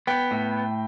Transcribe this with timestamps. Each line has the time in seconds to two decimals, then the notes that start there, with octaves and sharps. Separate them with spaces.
0.07 B3 G5
0.31 A2